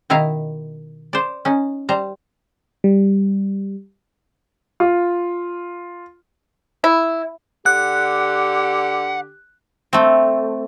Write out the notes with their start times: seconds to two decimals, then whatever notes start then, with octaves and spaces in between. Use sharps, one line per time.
0.10 B2 D#3 E4 F5 A#5
1.13 C5 D5
1.45 C#4 D#4
1.89 G3 C5 A#5
2.84 G3
4.80 F4
6.84 E4
7.66 D3 G4 F#5 F#6
9.93 A3 C4